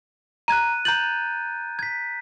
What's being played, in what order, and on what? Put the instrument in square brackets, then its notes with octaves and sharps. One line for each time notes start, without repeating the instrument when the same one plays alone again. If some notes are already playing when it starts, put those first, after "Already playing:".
[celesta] A#5 [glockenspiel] F#6 G#6 D#7
[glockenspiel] A#5 G6 A6 [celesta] F#7
[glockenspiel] G#6 B6